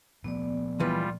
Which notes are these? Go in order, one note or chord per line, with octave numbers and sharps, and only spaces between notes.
A#2 F3 A3 B3 D5
C#2 E3 G3 F4 B4